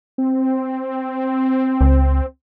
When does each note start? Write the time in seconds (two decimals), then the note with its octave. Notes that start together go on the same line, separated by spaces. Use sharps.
0.18 C4
1.81 C#2